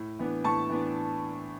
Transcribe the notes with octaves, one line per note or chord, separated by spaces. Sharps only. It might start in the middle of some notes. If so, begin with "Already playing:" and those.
Already playing: A2
E3 B3 D4
A2 A5 C#6
E3 B3 D4